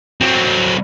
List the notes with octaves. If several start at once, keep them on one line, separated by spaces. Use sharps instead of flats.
F#3 C4